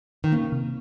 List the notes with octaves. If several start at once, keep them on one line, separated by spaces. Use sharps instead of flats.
D#3
C#3 A#3
C3